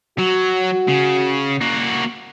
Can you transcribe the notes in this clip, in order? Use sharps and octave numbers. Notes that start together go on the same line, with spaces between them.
F#3 F#4
C#3
A#3 F#4